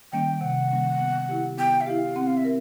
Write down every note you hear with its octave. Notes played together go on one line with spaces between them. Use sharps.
D#3 G3 A#3 C#4 G5
C3 F#5
D#3 G3 A#3 C#4
B3
E4 G4
B3 G5
E5
E4 G4 F5
C4 F#5
F5
E5
A#4